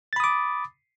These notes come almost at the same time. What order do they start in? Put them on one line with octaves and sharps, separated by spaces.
A6 B5 D#6 D6